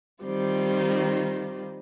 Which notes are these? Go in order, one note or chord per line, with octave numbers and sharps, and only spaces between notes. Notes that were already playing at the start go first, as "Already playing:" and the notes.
D#3 G3 C4 F4